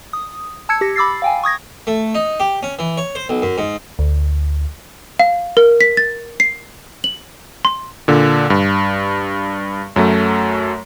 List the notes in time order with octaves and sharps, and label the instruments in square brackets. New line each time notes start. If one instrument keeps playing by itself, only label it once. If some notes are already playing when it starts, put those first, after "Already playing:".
[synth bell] D#6
A5 E6 G#6 C#7
G4 A#6
B5 D6 E6 A6 C7
F5 G5 G#5
C#6 D#6 G#6 A#6
[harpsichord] A3
D#4
G4
C#4
E3
C#5
C5
B1
F#2
G#2
[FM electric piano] D2
[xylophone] F5
A#4
B6
A6
C7
F#7
C6
[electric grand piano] A#2 D3
G2
F#2 F#3 A3